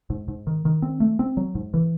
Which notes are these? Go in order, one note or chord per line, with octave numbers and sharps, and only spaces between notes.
G#2
G#2
D#3
D#3
C4
A3
C4
F#3
G#2
E3